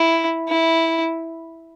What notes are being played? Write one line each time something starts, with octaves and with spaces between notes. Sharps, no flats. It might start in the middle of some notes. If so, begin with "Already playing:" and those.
Already playing: E4
E4